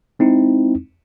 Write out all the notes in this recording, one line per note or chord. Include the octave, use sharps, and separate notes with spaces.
G#3 C4 D#4 E4